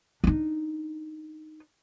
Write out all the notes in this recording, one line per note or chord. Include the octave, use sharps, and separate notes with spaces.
D4 D#4